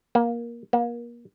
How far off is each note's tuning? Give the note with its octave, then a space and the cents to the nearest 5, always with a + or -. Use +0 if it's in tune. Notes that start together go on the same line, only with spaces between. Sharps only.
A#3 +20
A#3 +35